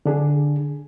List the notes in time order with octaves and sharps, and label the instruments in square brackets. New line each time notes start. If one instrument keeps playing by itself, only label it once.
[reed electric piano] D3 D4 G#4